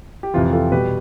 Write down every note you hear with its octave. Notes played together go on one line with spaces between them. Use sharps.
G4
F2 C3 E3 F4
F4 A4
B2 G3 G4 B4